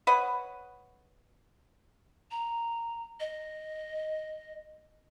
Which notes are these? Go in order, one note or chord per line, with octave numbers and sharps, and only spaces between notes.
B4 C#5 D#5 F#5
A#5
D#5